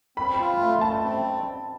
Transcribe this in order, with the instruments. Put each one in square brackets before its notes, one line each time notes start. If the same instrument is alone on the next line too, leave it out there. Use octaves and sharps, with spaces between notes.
[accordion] C4 [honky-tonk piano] B5
[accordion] F4
A3
[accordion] A3 [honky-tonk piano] A5
[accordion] C4